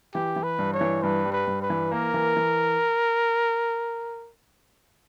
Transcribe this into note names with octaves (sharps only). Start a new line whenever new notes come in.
E3 G4
E3
B4
G2
C#5
E3
G2 B4
G3
B4
G2
B4
E3
A#3 A#4
E3
E3